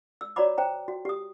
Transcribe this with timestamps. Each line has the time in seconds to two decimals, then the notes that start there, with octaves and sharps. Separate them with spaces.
0.21 E6
0.36 F#4 C#5 D5 A#5 B5 D6
0.58 C5 G5 A#5
0.88 F#4
1.05 G4 D#6